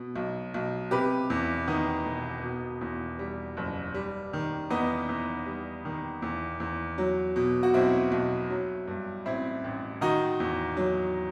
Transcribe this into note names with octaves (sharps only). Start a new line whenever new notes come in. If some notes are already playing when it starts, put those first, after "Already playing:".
Already playing: B2
B1
B1
C3 G4 B4
E2
D#3 B3 D#4
E1
B2
E2
G3
F#1
G3
D#3
E2 B3 D#4
E2
G3
D#3
E2
E2
F#3
B2
F#4
B1 C4 E4
B1
F#3
G2
A1 C4 E4
A1
D#3 D#4 F#4
E2
F#3